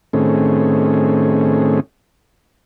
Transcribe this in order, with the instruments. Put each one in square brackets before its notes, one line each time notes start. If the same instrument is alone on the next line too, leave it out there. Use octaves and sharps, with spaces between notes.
[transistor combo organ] A2 D#3 A3 C4 C#4 G#4